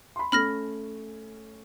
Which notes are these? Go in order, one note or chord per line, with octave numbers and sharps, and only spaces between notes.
B5 C6
A3 C#4 B5 F6 A#6